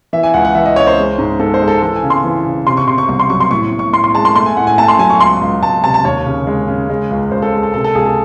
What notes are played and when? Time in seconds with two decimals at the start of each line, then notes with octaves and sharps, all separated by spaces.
0.13 E3 E5
0.23 G#5
0.34 C#2 F#5
0.45 F#5
0.55 E3 E5
0.66 D#5
0.76 C#2 C#5
0.87 C5
0.97 G#3
1.18 G#2
1.40 G#2 A4
1.54 C5
1.61 G#3
1.68 A4
1.82 E3 A4
1.96 G#5
2.03 C#3
2.10 C6
2.24 E3
2.45 C#3
2.67 C3 C6
2.77 C#6
2.88 C3 C6
2.98 C#6
3.09 C2 C#6
3.20 C6
3.30 F#3 C#6
3.40 C6
3.51 A2 C#6
3.72 A2
3.79 C#6
3.93 A2 C6
4.04 C6
4.14 G#3 A5
4.25 C6
4.35 A3 C6
4.46 G#5
4.57 A2 F#5
4.67 G#5
4.78 A3 A5
4.88 C6
4.99 F#3 G#5
5.10 C#6
5.20 C#2 C6
5.41 C#2
5.62 C#2 A5
5.84 C3 A5
5.94 A5
6.05 D#2 C#5
6.26 C#3
6.47 G#3
6.68 C#3
6.90 G#3
7.11 C#2
7.31 C#2 C5
7.42 A4
7.52 G#3
7.63 A4
7.74 C3 A4
7.84 A4
7.95 C#2 G#4
8.06 A4